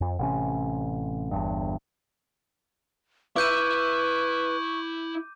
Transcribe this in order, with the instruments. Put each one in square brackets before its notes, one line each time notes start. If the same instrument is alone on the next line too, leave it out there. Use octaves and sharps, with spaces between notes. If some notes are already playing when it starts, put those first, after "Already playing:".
[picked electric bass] F2
A1 C3 C#4
G1 E2 G2
[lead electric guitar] E4 E5 [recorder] B4 [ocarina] C#6 [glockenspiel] D6 G6 D#7